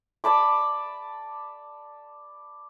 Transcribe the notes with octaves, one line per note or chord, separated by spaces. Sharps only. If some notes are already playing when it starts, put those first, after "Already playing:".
D5 A5 B5 D6